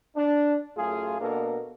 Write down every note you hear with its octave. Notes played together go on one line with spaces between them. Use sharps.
D4
F#2 A3 F4 G#4
B2 A#3 B3 D4 A4 A#4